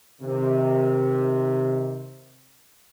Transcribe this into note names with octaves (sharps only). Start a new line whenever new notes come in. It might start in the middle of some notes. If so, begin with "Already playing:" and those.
C3 D#3